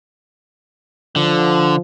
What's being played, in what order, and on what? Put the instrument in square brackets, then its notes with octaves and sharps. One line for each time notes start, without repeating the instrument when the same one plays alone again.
[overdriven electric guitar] D3 [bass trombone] F3